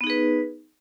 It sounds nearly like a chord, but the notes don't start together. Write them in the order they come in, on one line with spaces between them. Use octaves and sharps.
B3 D#4 G#4 B4